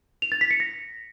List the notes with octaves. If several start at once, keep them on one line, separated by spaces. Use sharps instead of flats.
F7
A6
B6
C#7
A#6